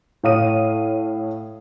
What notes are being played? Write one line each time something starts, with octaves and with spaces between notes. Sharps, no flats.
A2 C#5 F5 D#6 D#7